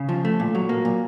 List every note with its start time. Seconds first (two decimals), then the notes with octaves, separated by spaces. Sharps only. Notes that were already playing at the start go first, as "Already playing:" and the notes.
Already playing: C#3
0.09 F3
0.25 A3
0.40 A#2
0.55 F#3
0.69 A#3
0.85 A#2